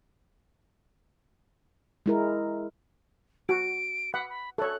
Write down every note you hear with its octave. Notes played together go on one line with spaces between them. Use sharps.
G#3 E4 A#4
F#4 D7
F#5 B5
B5
A4 C#5 F#6